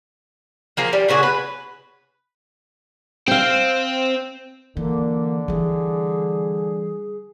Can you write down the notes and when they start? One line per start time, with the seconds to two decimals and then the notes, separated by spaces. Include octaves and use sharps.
0.77 F3 A#3 G#4
0.93 G3
1.08 A#2 C#3 F#4 G#4
1.23 B4
3.28 C4 F5 G5
4.77 D3 E3 A#3
5.48 E3 G3 G#4